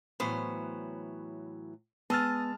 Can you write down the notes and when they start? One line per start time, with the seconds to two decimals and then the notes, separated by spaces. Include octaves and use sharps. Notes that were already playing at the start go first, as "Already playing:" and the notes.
0.20 A2 E3 F#3 B3 C5
2.10 G#3 B3 D#5 A5 E6 F6 A6